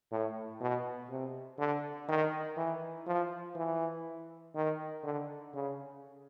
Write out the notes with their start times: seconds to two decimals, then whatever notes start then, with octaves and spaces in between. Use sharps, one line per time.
0.12 A2
0.61 B2
1.10 C3
1.59 D3
2.09 D#3
2.57 E3
3.07 F3
3.56 E3
4.55 D#3
5.04 D3
5.54 C#3